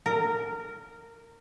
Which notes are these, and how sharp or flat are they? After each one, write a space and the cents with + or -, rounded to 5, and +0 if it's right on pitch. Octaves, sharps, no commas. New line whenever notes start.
A#4 -15